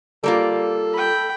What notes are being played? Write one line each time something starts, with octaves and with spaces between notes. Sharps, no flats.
G3 A#3 F4 A4
G5 B5